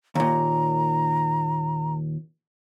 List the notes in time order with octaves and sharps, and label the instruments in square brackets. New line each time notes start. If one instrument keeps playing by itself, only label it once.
[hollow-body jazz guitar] D#2 A#2 [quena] A#5